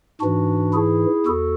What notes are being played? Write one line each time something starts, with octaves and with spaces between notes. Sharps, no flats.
G#2 E3 D4 F#4
E4 G#4
E2 F#4 A4